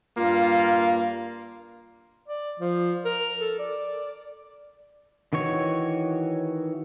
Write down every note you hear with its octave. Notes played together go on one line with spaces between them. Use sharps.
G2 A#3 F4
D5
F3
A#4
A4
D5
D#3 E3 F#4 C#5